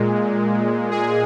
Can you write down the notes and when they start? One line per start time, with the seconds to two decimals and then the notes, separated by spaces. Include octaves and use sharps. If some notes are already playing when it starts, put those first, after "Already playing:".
Already playing: A#2 G#3
0.91 G#4